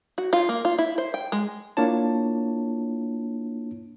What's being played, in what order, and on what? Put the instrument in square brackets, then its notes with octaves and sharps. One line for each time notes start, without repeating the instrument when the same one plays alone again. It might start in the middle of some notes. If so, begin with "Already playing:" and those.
[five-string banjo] F#4
F4
A#3
F4
E4
C5
G5
G#3
[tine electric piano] A#3 D4 E4 F4 C#5 A5